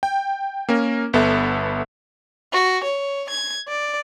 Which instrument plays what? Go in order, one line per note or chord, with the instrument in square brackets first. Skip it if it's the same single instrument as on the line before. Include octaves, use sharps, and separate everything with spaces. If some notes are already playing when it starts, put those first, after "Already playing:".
[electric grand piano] G5
A#3 C#4 A#4
G1 B3 A4 E5
[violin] F#4
C#5
G#6
D5